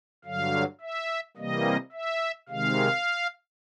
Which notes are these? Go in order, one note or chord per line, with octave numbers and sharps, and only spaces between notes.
G2 D3 F#3 F5
E5
C3 E3 G3 A#3 D#5
E5
C3 D#3 G#3 F5